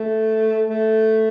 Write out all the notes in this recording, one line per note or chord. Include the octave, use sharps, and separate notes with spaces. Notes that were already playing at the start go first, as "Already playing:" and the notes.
Already playing: A3
A3